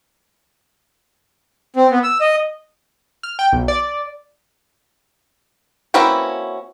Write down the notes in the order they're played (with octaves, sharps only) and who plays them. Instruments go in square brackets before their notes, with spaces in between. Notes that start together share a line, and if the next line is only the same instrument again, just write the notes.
[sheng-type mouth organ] C4
B3
E6
D#5
[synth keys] F6
G5
B1
D5
[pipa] A#3 C4 E4 [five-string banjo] C#4 F#4 B4